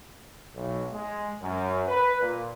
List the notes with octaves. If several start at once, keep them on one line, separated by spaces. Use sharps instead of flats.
B1
G#3
F#2
B4
A#2